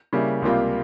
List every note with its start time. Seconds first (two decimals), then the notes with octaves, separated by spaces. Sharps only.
0.13 C#3 G3 A#3 E4
0.42 C#2 C3 G3 A#3 F4